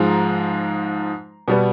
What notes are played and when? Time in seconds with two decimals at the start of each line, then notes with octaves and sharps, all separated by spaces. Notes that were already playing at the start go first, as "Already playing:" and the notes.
Already playing: G#2 F3 G#3 A#5
1.48 B2 G3 B3